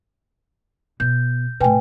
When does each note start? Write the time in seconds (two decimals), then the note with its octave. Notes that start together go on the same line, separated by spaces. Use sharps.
1.00 B2 G6
1.60 A2 C3 B4 G5 G#5